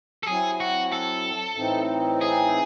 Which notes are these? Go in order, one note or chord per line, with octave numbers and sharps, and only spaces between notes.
A4
F#3 C4 E4 G#4
F#4
A4
A2 E3 C4 D#4
G#4